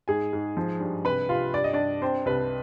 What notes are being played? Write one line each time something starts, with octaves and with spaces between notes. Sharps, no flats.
G#2 G#4 G#5
G#2
F3
G2
C2 B4 B5
C3 F4 F5
G2 D5
D#5
G2 D4 D5
C4 D4 C5
C2 B4